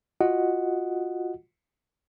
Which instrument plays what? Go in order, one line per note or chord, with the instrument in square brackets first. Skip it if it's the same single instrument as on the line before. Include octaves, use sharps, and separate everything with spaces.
[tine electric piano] F4 F#4 D#5 F#5